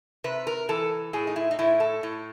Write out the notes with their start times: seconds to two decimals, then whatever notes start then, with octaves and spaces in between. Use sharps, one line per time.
0.24 C3 B4
0.47 A#4
0.69 E3 A4
1.13 A2 G#4
1.27 D#4
1.36 E4
1.51 D#4
1.59 A2 E4
1.80 A4
2.03 A2